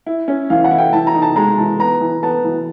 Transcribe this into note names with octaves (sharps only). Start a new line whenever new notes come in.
E4
C#4
E3 F5
F#5
E4
G5
E3 A5
A#5
D#4
A5
G#3 A#5
E3 A5
B3 A#5
E3
B3 A5
E3